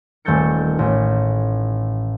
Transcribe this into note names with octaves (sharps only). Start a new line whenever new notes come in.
D#1 A3 E6 G6 A6 C#7
A1